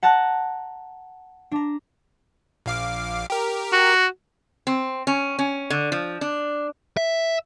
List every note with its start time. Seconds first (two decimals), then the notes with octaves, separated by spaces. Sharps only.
0.03 F#5 A5 A#5 F#6
1.52 D4 A#5
2.66 A#1 F5 D6
3.30 G4 A#4
3.72 F#4
4.67 C4
5.07 C#4
5.39 C#4
5.70 D3
5.92 F3
6.21 D4
6.97 E5